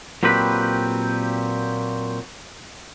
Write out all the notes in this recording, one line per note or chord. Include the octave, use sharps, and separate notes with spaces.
A#2 F#3 C4 G4 B4 B5